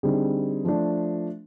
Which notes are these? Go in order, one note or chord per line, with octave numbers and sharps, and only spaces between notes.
D3 G3 C4 D#4 G#4
F3 A3 D4